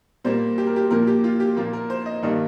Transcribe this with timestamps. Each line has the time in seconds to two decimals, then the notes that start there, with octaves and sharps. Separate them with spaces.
0.24 A#2 G3 A#3 C5
0.58 G4
0.67 A#4
0.76 G4
0.91 A#2 F3 A#3 A#4
1.07 G4
1.24 F4
1.40 G4
1.56 A#2 F3 A#3 F4
1.73 A#4
1.90 C5
2.06 D#5
2.23 G2 D#3 G3 A#3 D#5